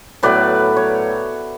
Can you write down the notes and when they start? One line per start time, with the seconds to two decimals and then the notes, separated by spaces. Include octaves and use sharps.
0.23 A2 F#3 B3 B4 D5
0.76 C#5